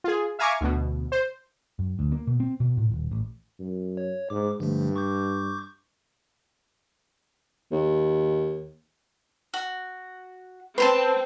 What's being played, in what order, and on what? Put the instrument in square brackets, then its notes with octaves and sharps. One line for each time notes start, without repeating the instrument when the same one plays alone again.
[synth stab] F4 G#4
E5 F5 G#5 A#5 C#6 D6
D2 B2
C5
[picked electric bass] F#2
D2
A#3
B2
C4
B2
A2
D#1
A1
[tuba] F#2
[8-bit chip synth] C#5
[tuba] G#2 [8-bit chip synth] D6
[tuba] G2 [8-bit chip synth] D3 F3 A3
[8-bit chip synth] C#6 D6 G6
[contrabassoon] D#2
[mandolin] F#4
[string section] C4 [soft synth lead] B4 [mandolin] A5 A#5 C6